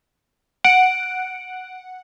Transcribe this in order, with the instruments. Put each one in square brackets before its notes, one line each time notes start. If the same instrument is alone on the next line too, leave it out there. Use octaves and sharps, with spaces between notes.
[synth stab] F#5 [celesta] D7